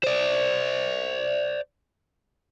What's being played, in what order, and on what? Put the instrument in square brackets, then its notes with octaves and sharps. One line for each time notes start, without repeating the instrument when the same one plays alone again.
[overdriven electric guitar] C5 D5